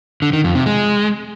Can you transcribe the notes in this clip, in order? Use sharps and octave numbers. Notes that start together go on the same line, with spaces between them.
D3
D#3
F2
C3
G#3